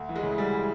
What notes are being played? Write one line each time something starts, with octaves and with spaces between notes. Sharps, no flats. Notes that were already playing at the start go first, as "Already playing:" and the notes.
Already playing: D2
E3
G#3
C#3
D2 G3